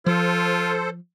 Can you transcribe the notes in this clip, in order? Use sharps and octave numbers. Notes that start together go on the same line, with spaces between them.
F3 F4 A4 C5